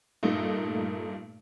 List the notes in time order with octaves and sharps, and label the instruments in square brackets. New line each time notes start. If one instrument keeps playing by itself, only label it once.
[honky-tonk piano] G2 A#2 A3 A#3 D#4